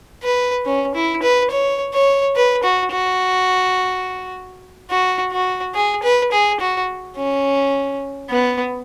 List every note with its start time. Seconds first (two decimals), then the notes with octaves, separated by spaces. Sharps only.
0.23 B4
0.65 C#4
0.95 E4
1.23 B4
1.51 C#5
1.94 C#5
2.36 B4
2.63 F#4
2.92 F#4
4.90 F#4
5.32 F#4
5.75 G#4
6.03 B4
6.32 G#4
6.60 F#4
7.17 C#4
8.30 B3